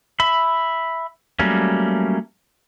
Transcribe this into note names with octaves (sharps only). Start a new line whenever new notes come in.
E5 B5
F#3 G3 A3 A#3 C#4